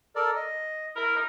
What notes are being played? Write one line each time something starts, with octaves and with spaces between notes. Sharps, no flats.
A4 A#4 D5
D#5
E4 A#4 B5
D#4 A#4